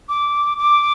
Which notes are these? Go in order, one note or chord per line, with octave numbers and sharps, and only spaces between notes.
D6
D6